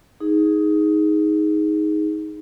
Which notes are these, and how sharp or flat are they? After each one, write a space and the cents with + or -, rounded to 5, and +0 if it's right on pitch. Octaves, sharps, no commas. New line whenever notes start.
D#4 +10 G#4 +0